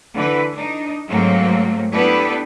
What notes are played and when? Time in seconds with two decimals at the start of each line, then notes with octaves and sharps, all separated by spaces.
0.13 D3 E3 B4
0.52 D4 D#4
1.07 G#2 F#3 A3 A#3 C4
1.92 B3 D4 E4 G4 A4 B4